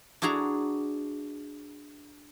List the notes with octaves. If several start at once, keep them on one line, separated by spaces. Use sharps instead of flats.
D4 E4 F#4 G#4 A#5